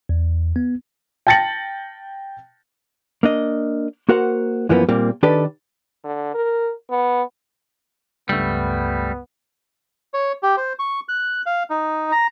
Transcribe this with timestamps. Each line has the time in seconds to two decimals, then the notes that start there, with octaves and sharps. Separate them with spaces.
0.09 E2
0.56 B3
1.27 G5 A5 A6 A#6 C#7 F#7
3.23 A#3 D4 D#5
4.09 A#3 F#4 A#4 C5 F#5
4.69 F#2 E3 F3 A#3 B3
4.89 A#2 G3 A#3 C4
5.23 D#3 D4 G4 A4 B4 D5
6.04 D3
6.34 A#4
6.90 B3
8.29 C#2 G2 G3 A3 B3
10.14 C#5
10.43 G4
10.57 C5
10.79 C#6
11.09 F#6
11.46 F5
11.70 D#4
12.12 A#5